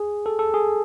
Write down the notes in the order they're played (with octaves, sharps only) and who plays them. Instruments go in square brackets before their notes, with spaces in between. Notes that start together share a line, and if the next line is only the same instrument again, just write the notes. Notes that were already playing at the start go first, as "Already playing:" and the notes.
Already playing: [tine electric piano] G#4
A4
A4
G#4